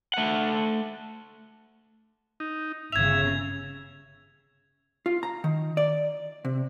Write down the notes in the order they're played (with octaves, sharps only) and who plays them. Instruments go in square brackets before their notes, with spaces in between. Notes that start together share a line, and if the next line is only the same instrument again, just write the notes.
[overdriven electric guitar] A3 F#5
[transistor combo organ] D#4
[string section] G1 C#3 [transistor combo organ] E5 [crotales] G#6 F7
[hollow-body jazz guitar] F4
A#5
D#3
D5
C3